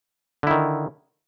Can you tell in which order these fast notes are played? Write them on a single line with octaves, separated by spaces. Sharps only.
D3 E4 D#3